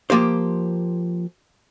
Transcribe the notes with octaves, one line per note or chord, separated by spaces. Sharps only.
F3 A#3 G4 C5